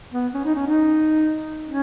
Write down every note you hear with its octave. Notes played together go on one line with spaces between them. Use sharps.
B3
C#4
D#4
C#4
D#4
C#4